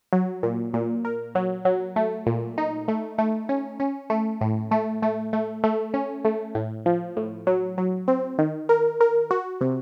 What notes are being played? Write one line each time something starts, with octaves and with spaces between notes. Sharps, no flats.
F#3
A#2
A#2
A#4
F#3
F#3
A3
A#2
D#4
A3
A3
C#4
C#4
A3
A2
A3
A3
A3
A3
C#4
A3
A2
F3
A2
F#3
F#3
C4
D#3
A#4
A#4
F#4
C3